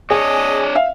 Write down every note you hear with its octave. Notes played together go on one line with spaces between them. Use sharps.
D4 G#4 C#5 D#5
E5 F5